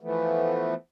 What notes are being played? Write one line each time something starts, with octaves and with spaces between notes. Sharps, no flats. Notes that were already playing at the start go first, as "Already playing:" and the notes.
E3 F3 A3 B3